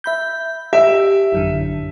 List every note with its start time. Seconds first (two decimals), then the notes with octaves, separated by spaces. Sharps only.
0.04 E5 B5 G6
0.73 G4 E5
1.32 A1 F#2 D3